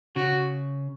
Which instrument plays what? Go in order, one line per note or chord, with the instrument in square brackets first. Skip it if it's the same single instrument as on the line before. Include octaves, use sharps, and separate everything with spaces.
[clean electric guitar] C#3 [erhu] F#4